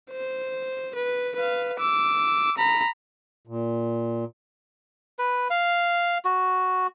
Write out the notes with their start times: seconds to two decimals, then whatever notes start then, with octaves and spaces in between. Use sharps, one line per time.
0.10 C5
0.95 B4
1.36 B4 F5
1.79 D6 E6
2.57 A#5 B5
3.47 A#2
5.19 B4
5.50 F5
6.25 F#4